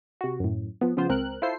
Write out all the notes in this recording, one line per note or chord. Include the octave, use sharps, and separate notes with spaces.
C3 F#4
F#2 A2
F3 B3
C#3 F3 B3 F4 C5
C#2 C4 A#4 F#6
E4 F4 A4 C5 C7